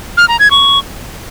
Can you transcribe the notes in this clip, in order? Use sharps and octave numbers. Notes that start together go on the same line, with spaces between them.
F6
A#5
G#6
C#6